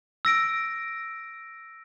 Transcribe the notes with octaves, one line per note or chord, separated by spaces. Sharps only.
E6 A#6 D7